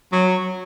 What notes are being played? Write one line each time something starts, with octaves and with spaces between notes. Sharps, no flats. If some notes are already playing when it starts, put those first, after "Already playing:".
F#3